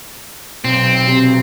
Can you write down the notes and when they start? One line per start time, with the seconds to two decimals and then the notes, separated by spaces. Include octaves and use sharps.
0.65 B1 C4
1.07 C3